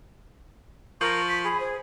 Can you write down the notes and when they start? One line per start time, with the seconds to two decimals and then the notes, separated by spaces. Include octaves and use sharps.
1.01 F3 A#4 C#6
1.28 B6
1.44 G#4 B5
1.60 C5